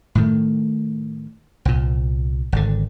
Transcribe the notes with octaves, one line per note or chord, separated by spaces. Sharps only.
A2 D#3 A3
C2 A#2
G#1 D3